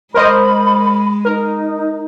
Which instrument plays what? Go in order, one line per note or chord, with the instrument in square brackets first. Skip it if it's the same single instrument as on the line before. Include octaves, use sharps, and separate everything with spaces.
[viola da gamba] G#3 [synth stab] A#4 C5 D#5 [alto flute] B5
[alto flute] D#4 [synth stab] A#4